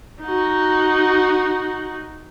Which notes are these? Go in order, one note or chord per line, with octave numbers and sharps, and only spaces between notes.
D#4 F#4